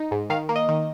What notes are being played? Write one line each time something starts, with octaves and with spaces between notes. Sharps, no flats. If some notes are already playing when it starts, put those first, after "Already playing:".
Already playing: D#4
G#2
D#3 F5
A#3
D#5
D#3